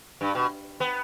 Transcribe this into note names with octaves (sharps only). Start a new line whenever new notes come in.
G2
B2
B3